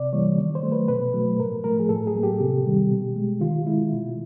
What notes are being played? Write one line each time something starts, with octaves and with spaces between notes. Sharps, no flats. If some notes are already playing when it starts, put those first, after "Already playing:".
Already playing: C3 D5
E3 G3 A#3 C#5
D#3
C5
F#3 A3
B4
B2 B4
F#3 A3
A2 A#4
F3 A3 A#4
G#4
A2 A4
G#4
F#3 A#3
G4
C3
D#3 G3
B2
G#3
D#3 F4
G#3 E4
B2